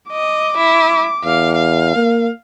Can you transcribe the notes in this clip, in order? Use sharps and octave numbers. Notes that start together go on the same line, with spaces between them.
D#5 D6
E4
E2 F5
F5
A#3